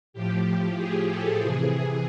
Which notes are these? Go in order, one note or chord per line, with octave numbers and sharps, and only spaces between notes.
A2 F3 G4
G#4
A4
C3 E3 G#4